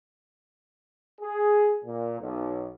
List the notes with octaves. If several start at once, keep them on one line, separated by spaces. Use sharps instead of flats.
G#4
A#2
B1